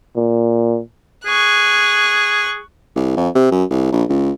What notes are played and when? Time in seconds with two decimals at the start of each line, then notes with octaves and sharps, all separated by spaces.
0.16 A#2
1.26 G#4 C#6 F#6
2.96 C2
3.17 F2
3.35 C3
3.51 F#2
3.71 C2
3.92 A#1
4.09 C#2